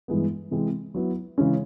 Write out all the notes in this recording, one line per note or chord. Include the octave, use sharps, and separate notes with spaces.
G2 E3 G#3 B3
C3 E3 G#3 C4
F#3 B3 E4
C#3 E3 G#3 C#4